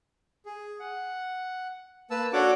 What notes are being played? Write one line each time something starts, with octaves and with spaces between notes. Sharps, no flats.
G#4
F#5
A#3 B4 A5 E6
D4 F#4 A4 C#5 F#5 D6